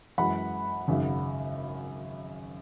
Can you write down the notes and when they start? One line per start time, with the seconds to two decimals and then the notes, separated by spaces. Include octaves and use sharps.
0.18 F#2 E3 G#3 F#5 B5
0.88 G#1 F#2 C#3